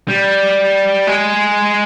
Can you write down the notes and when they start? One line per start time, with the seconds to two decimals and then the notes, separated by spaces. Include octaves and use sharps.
0.08 G3
1.07 G#3